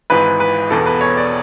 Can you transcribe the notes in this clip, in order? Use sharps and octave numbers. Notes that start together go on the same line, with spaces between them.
G#1 G#2 E3 B4
B4
E1 E2 B2 A4
B4
C#5
D5